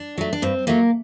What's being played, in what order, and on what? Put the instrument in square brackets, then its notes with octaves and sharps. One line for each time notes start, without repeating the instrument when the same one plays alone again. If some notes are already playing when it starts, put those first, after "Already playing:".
Already playing: [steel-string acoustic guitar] D4
F#3 A3
D4
G2 C4
F#3 A3 A#3